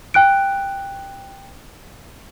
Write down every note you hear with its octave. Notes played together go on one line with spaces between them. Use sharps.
G5 F#6 D7